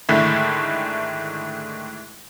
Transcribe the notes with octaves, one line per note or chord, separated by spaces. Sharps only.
G#2 D3 D#3 G#3 A3 E4